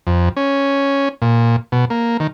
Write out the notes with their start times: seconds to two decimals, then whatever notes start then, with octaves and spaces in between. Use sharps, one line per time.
0.07 F2
0.37 C#4
1.22 A#2
1.72 B2
1.90 A#3
2.20 D#3